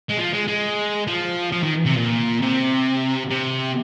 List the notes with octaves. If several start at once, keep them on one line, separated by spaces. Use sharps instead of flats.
G#3
F3
G#3
G#3
F3
F3
D#3
C3
A#2
C3
C3